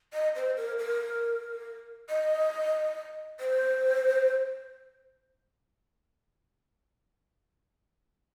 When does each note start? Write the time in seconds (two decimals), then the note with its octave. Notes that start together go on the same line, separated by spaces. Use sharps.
0.13 D#5
0.36 C5
0.57 A#4
0.79 A#4
2.09 D#5
3.40 C5